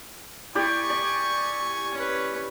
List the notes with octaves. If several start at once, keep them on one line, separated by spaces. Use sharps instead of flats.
E4 G4 D5 G#5 C#6
D5
C#4 B4